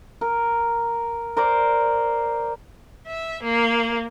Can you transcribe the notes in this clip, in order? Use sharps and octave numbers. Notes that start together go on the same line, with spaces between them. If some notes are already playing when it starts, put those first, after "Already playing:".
A#4
A#4 C5 D5
E5
A#3